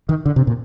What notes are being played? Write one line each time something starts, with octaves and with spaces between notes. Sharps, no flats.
D#3
D3
C3
A#2